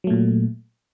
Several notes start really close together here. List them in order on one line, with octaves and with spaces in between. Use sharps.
F#3 A3 A#2